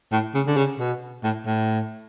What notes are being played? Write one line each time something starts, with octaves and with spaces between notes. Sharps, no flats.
A2
C#3
D3
C#3
B2
A2
A2